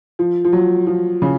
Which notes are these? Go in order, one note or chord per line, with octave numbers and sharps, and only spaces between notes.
F3
F3
F#3
F3
C#3